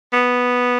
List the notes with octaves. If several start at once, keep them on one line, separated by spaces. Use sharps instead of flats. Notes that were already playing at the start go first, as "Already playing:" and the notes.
B3